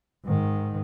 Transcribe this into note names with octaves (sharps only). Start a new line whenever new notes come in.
G#2 D#3